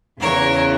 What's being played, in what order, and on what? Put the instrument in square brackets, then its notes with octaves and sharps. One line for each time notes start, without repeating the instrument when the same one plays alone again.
[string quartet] E2 C#3 E3 A#4 C#5